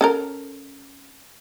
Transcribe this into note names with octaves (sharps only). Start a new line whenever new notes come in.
C#4 A4 A#4